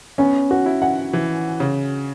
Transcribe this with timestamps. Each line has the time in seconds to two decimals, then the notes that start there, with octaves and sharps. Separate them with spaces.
0.18 B3 C#4
0.51 F#4
0.66 E4
0.82 F#5
1.13 E3
1.60 C#3